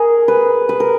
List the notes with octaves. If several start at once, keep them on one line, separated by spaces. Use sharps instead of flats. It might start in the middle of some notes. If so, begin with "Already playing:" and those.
Already playing: G#4 A#4
B4
B4
A#4